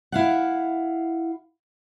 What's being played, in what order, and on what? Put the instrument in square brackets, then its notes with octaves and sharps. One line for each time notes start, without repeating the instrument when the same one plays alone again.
[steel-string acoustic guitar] E4 F5 F#5